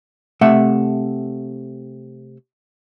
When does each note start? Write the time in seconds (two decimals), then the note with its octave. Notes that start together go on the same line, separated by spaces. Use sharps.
0.41 C3 A3 E5 F#5